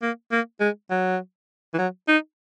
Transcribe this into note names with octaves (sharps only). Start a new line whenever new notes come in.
A#3
A#3
G#3
F#3
E3
F#3
D#4